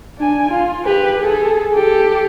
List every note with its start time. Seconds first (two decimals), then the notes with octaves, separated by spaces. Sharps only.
0.18 D4 G#5
0.49 F4
0.85 G4 B4
1.19 G#4 A4
1.74 G4 A4